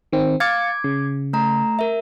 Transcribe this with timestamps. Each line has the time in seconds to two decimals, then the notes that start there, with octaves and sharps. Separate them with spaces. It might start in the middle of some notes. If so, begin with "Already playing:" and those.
0.12 D#3 C4
0.40 F5 D6 G#6 A6 C#7
0.84 C#3
1.33 A3 A#5
1.79 A#4 E5